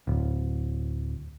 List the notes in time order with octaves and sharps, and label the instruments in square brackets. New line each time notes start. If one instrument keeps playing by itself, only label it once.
[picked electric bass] D1